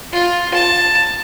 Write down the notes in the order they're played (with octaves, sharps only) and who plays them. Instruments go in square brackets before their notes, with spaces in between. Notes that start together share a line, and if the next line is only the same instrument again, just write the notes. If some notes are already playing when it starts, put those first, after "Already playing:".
[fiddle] F4
A5